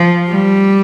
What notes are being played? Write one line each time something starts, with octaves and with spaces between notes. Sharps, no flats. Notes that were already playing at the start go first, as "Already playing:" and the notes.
Already playing: F3
G3